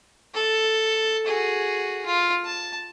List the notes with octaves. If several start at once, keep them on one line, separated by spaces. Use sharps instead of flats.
A4
F#4 G#4
F4
A5